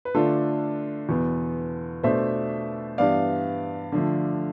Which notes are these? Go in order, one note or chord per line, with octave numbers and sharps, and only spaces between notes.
B4
D3 A3 D4 F4 A4
E2 B2 B3
B2 A3 D4 C5 E5
G2 E3 B3 D5 F5
D3 F3 A3